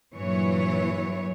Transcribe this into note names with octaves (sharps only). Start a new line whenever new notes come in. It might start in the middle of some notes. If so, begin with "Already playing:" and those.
G2 A#2 E3 F#3 C#5